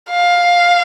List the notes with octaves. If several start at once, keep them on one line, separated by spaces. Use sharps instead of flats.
F5